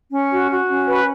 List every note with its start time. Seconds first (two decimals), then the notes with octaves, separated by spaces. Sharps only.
0.11 C#4
0.31 F#4
0.51 F#4
0.69 C#4
0.89 B4